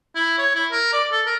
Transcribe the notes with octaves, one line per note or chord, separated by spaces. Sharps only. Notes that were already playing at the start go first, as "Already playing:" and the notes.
E4
C#5
E4
A#4
D5
A4
A#4